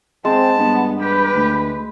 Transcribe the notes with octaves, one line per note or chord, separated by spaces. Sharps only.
G#3 C4 A5
G2 B3
G4 B4
D2